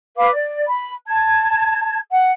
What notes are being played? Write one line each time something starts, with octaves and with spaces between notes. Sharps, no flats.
B4 F5 D6
D5
B5
A5 G#6
F#5